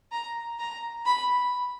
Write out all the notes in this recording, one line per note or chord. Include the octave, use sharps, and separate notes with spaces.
A#5
A#5
B5